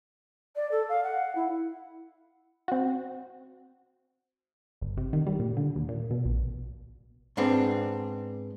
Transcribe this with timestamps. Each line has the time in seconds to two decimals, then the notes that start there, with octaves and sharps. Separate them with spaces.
0.56 D5
0.71 A4
0.89 F5
1.04 F#5
1.36 E4
2.68 C4 F#4
4.81 G1
4.97 C3
5.13 D#3
5.26 G3
5.40 A#2
5.57 D3
5.76 D#2
5.89 A#2
6.11 B2
6.25 A#1
7.37 G#2 B3 C4 D4